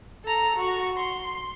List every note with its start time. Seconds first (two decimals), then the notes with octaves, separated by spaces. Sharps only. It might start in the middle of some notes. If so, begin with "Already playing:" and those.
0.24 A4 A#5
0.56 F#4 C#6
0.97 C6